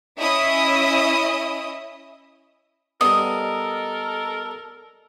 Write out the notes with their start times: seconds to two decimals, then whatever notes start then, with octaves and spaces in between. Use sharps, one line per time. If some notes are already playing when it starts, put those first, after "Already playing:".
0.20 C#4 E4 D#5 E5 D#6
3.01 G3 B3 A4 A#4 D#5 D#6